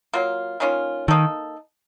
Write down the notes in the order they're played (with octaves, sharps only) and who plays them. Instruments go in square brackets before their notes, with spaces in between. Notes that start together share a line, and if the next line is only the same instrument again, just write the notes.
[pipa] F#3 A#3 F4
D#3 A#3 C#4 F4
[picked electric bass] D#3 [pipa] A#3 D#4 A4